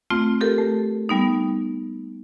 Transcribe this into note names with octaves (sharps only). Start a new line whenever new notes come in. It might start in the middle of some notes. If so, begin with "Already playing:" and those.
A3 C4 F4
G4 A4 A#4
A3
G3 B3 D#4